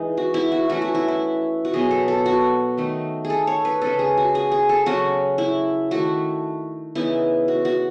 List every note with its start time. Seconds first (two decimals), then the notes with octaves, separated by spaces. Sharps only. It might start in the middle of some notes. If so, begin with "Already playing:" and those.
Already playing: E3 G#3 D#4
0.17 F#4
0.34 E4
0.52 F#4
0.69 E3 A3 C#4 E4 F#4
0.82 F#4
0.95 E4
1.08 E4
1.65 F#4
1.73 B2 F#3 B3 G#4
1.91 A4
2.08 A4
2.26 F#4
2.77 D#3 A3 D#4
3.25 G#4
3.30 A4
3.47 C#5
3.65 B4
3.82 C#3 G#3 C#4 A4
3.99 G#4
4.17 F#4
4.35 G#4
4.52 G#4
4.69 A4
4.86 C#3 F#3 C#4 F#4
5.38 E4
5.91 D#3 A3 E4 F#4
6.95 C#3 E3 B3 D#4 E4
7.48 F#4
7.65 F#4